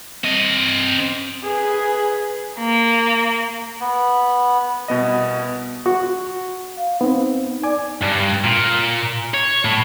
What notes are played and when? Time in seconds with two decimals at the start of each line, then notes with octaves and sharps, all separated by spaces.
0.24 C4 D#5
1.44 G#4 B4
2.59 A#3
3.80 B3
4.88 C2 B2 B3 D#5
5.86 F#4
6.77 F5
7.01 B3 C4 D#4
7.63 D5 G#5 D6
8.02 G2
8.44 A#2
9.34 C#5
9.65 A2